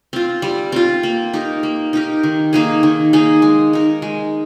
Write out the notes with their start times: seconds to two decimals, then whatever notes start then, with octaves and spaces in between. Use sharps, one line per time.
0.13 C4 F4
0.42 G3
0.72 C4 F4
1.03 A#3
1.33 D#4 G4 A#4
1.63 A#3
1.93 D#4 G4 A#4
2.23 D#3
2.53 A#3 D#4 G#4
2.83 D#3
3.13 A#3 D#4 G#4
3.42 G#3
3.73 D#4 A#4
4.02 G#3